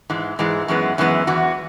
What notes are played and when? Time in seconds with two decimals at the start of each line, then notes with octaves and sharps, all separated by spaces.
0.10 G#2 E3 G#3
0.39 G#2 E3 G#3
0.68 F#2 E3 G#3 B3
0.98 F#2 E3 G#3 B3
1.27 E2 E3 F#4